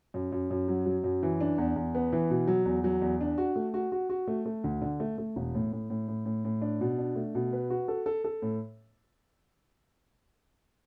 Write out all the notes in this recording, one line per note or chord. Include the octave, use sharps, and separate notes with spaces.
F#2
F#2
F#2
F#3
F#3
F#2
E3
D4
E2
E2
B3
E3
B2
F#3
E2
F#3
E2
D4
F#4
A3
F#4
F#4
F#4
A3
A3
D2
D3
A3
A3
E1
A2
A2
A2
A2
A2
A2
D4
B2
D4
A3
B2
B4
F#4
A4
A4
A4
A2